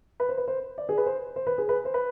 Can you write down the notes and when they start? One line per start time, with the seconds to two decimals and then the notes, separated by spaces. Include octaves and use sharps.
0.20 B4
0.29 C5
0.38 B4
0.48 C5
0.78 D5
0.89 G#4
0.98 B4
1.06 C5
1.36 C5
1.47 B4
1.58 G#4
1.69 B4
1.85 C5
1.94 B4